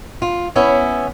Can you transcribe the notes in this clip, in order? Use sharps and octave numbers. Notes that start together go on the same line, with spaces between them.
F4
B3 C#4 E4